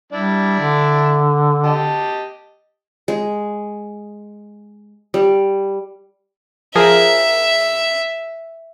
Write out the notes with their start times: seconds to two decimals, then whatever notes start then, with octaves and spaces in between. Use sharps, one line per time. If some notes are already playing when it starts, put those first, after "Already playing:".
0.12 G3 D4 E4 D5
0.60 D3
1.64 G4 D#5 A5
3.08 G#3
5.14 G3
6.75 F3 G#4 A#4 E5